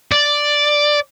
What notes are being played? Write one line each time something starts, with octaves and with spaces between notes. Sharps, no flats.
D5